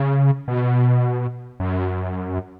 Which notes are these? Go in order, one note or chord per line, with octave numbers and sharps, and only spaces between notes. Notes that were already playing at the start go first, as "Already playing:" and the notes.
Already playing: C#3
B2
F#2